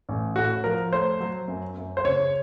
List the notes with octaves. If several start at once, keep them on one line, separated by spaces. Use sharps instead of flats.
A1
A2 F#4
F3 A#4
A3 C5
F#3
F#2
F#2
C5
C#3 C#5